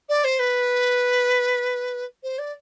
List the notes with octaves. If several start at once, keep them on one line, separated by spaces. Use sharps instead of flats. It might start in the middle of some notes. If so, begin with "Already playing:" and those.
D5
C5
B4
C5
D5